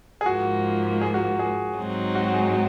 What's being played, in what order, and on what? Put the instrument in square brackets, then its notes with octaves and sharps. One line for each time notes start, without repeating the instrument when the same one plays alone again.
[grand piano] G#4
[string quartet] G#2 F3 A#3 [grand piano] F#4
[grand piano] G#4
F#4
G#4
[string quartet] G#2 F#3 C4 D#4
[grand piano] F#4
G#4
F#4